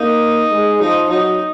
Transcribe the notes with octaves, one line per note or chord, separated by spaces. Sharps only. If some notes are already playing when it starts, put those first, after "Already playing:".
Already playing: A#3 D#4
G#3
F3 D#4
F#3 D#4